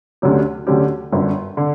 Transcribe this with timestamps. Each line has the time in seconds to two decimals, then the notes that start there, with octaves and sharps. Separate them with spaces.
0.22 D2 D3 F#3 C#4 G4
0.67 D2 D3 F#3 C#4 G4
1.12 G1 F#2 D3
1.57 D3